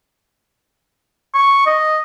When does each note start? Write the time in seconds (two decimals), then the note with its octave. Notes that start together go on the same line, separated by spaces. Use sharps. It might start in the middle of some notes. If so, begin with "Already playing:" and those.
1.34 C#6
1.66 D#5